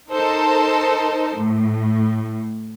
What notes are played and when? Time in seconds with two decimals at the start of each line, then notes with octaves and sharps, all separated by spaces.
0.12 D#4 A4 A#4 C5
1.37 A2